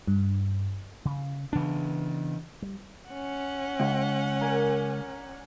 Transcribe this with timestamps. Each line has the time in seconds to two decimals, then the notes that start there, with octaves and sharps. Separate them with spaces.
0.07 G2
1.05 C#3
1.53 C#3 E3 B3 D4
2.62 G3
3.09 C#4 F#5
3.80 C#2
4.41 A#4 D5 G#5